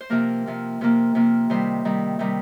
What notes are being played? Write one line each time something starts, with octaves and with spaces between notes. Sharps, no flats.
C5
C3 F3 A#3 A#4
C3 F3 A#3
C3 F3 A#3
C3 F3 A#3
C3 D#3 G3 C5
C3 D#3 G3
C3 D#3 G3